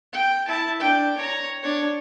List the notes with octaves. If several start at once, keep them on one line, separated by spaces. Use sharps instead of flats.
G5
E4 A5
D4 G5
C#5 A#5
D4 C#5